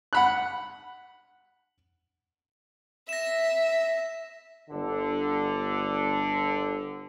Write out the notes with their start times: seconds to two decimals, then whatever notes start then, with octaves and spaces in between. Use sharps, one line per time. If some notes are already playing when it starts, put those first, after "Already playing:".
0.13 F#5 B5 F#6
3.09 E5 A#6 E7
4.69 G1 D3